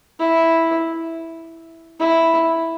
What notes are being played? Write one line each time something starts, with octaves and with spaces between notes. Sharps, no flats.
E4
E4